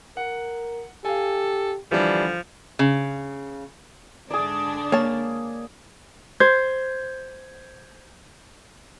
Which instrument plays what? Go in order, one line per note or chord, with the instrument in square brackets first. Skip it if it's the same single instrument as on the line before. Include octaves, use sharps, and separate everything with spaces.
[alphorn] A#4 [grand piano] F#5
[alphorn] G4 [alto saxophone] A4 [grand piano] F5 G#5
[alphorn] D3 [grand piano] E3 G3 D4 [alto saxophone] F3
[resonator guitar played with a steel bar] C#3
[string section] G#2 D3 D4 [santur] G#4 D5
[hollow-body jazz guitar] A#3 [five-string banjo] C#5 A5
[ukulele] C5 [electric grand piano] G6 G#6